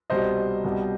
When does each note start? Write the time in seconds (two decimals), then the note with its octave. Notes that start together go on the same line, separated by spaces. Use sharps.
0.10 C2 B2 G3 C5 D#5
0.64 C2 B2 G3